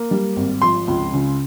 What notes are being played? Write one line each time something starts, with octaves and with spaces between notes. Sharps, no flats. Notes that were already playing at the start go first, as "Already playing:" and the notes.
Already playing: A#3
G3
G#1
F3 C6
C#2
C#3